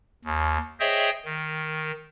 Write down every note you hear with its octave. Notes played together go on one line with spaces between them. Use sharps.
D#2
G#4 C5 C#5 D#5 E5 G5
D#3